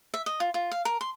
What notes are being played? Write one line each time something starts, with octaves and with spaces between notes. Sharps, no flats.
E5
D#5
F4
F4
F5
A#4
C6